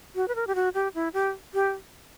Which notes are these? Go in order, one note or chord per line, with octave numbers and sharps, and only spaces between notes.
F#4
B4
A#4
G4
F#4
G4
E4
G4
G4